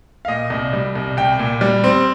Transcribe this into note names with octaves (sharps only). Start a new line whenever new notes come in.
F5
A#2 D#5
C2
G3
C2
C2 G5
A#2
G3
C4